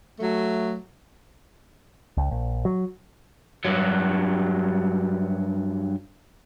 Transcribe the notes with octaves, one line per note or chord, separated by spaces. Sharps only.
F#3 A3
C#2
A#1
F#3
G2 F#3